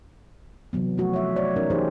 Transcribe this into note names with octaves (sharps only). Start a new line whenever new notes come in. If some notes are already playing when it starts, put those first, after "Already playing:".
C3 E3 F#3 B3
F3 A3 F#4
C#5 E5
A3 C#5 D5
E3 C#4 D#4 A#4
E3 D#4 G4 G#4 C5